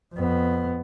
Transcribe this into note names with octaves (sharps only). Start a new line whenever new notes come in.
F2 B3